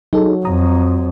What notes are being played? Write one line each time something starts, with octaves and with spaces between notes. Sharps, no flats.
F#3 D#4 G#4 A4
F2 A#5 D#6